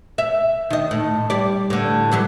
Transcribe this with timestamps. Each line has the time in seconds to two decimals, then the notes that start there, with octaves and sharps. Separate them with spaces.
0.18 E5
0.70 D#3 D#5
0.91 A2
1.30 G3 D5
1.70 A2 D3
2.11 E3 F#3 G3